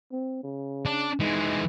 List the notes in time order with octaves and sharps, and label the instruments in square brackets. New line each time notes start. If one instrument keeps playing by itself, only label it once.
[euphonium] C4
C#3
[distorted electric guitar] D4
[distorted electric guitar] E3 G#3 [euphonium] D#4